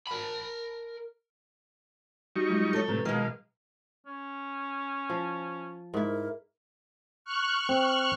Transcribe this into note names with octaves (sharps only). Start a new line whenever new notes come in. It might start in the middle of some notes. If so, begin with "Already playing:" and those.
A#4 B5
G3 D#4 F#4 C#6
F#3 G#3 F4
A4 C#5
A2 C3 B4 A#5
B2 D#3 G#3 F5
C#4
F3
G#2 E4 A#4
C#6 F6 F#6
C4